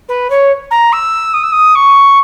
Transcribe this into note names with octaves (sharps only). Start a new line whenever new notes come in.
B4
C#5
A#5
E6
D#6
E6
D#6
C#6